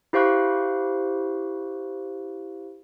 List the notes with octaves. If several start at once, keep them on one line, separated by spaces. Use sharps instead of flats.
E4 G4 C5 F5 C#6 F#6